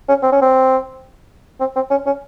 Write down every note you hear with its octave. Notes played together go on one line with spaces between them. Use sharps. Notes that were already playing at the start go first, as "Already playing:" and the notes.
C#4
C4
C#4
C4
C4
C4
C#4
C#4